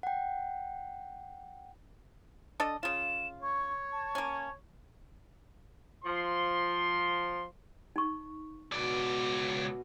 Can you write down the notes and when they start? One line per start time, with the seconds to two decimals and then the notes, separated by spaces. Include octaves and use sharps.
0.03 F#5 G5
2.60 D4 A4 D#5
2.83 C#3 F4 E7
3.42 C#5 C#6
3.92 A5
4.15 A#3 C#4
6.04 F3 C6
7.96 D#4 C#6
8.72 C#2 B2 D5